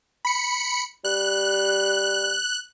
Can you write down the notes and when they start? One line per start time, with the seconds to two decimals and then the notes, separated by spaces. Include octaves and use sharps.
0.25 B5 C#7
1.05 G3 F#6